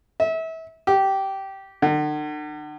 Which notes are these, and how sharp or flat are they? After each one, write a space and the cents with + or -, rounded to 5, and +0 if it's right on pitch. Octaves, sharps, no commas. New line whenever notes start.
E5 -30
G4 -15
D3 +45